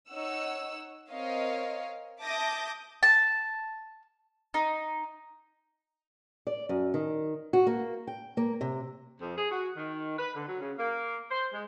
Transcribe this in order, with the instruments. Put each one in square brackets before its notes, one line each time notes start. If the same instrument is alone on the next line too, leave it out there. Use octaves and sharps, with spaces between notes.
[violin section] D#4 C#5 F#5 E6
C4 A#4 C#5 D#5 F5
E5 A5 D6 D#6 G6 A#6
[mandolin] A5
D#4
[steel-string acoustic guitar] D5
F#2
D#3
F#4
A#3
G5
A#3
C3
[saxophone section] F2
G#4
F#4
D#3
B4
D3
F#3
C#3
A#3
C5
G#3